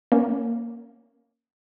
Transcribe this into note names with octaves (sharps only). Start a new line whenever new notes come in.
A#3 C#4